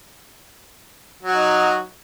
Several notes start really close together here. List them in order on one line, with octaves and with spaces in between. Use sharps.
F#3 F#4 D#4